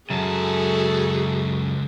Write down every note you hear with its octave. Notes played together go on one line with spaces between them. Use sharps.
C#2 F#2 F#4 G#4 A4 A5